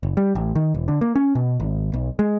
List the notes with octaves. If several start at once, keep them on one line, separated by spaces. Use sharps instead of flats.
F#1
G3
A1
D#3
E1
D3
A#3
C#4
B2
G#1
B1
G#3